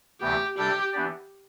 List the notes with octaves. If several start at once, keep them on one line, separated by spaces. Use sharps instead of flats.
D2 C3 E3 B3 G4
C3 G3 D4 G4 A4
E3 B3 D4 G4 D5